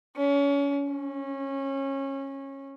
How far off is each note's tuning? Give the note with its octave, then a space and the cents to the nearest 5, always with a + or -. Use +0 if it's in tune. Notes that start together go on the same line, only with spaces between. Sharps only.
C#4 +30
C#4 -20